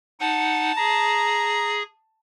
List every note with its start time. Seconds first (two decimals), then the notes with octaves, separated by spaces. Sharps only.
0.20 D#4 F#5 A5
0.77 G#4 A#5